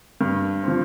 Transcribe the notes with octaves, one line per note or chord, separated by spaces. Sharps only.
G2
F3 C4